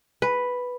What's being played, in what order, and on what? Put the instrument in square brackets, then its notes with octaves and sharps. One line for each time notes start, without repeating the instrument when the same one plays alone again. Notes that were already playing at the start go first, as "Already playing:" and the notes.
[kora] B4